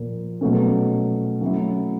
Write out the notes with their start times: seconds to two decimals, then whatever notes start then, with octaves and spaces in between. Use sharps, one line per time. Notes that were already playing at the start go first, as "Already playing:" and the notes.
Already playing: A#2 F3 A#3
0.41 B2 F#3 A3 C#4
1.41 F#3 A3 C#4 E4